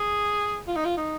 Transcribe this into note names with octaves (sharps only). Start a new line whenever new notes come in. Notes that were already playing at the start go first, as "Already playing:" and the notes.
Already playing: G#4
F4
D#4
F4
D#4